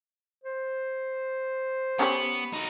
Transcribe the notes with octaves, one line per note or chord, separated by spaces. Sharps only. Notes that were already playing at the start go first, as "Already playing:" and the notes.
C5
B3 C#4 G4 C#5
D#4 F#4